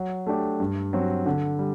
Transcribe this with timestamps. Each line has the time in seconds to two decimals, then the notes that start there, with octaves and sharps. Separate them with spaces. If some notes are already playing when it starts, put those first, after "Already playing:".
Already playing: F#3
0.27 A3 D4 G4
0.60 G2
0.93 F#3 C4 F#4
1.26 D3
1.59 G3